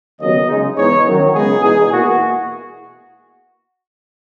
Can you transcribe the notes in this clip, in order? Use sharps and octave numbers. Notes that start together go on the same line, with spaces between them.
D#2 C#3 F#3 B3 D#5
C#3 G#3 D#4
G#2 E3 B3 D#4 C#5
F#2 D#3 F#3
C#2 C#3 G#3 B3 D#4 G#4
E2 B2 G#3 D#4 G#4
B2 A#3 E4 F#4